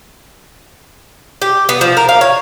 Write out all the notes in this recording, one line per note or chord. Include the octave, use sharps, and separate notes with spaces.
G4
B3
F3
A#4
F5
C#5